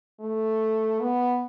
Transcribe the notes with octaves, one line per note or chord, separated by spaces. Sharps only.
A3
B3